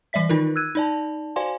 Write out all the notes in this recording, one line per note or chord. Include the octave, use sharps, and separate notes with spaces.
E3 G3 D5 E5 B6
D#3 D#4 F4 A#4
E6 F#6 G#6 D#7
D#4 D5 A5
F#4 C5 D5 F5 G#5 C6